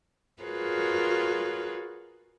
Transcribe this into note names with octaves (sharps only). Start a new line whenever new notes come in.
F4 F#4 G#4 A#4 B4 C#5